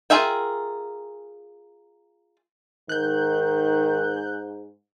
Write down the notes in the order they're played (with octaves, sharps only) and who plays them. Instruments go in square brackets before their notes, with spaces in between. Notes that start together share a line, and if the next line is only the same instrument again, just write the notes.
[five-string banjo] F4 G#4 A#4 E5 G5
[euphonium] G#2 [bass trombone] D#3 [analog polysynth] F#6 G6